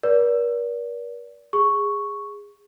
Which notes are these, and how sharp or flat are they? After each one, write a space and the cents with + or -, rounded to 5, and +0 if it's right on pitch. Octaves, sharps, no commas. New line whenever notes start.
A#4 +45 D5 -30
G#4 -20 C#6 +0